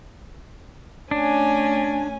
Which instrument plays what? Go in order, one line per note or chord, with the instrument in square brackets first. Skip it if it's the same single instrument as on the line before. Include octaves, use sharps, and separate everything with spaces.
[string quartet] A3 C#4 G#5 [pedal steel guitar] D4